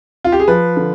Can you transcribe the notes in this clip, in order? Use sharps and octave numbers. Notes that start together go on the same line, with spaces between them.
F4
G4
G#4
F3 B4
D3